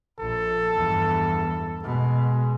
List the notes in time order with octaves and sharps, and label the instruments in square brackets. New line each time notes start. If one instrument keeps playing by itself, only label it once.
[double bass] A#1 [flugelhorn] A4
[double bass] E2 G2
[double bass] B2 [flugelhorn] G#3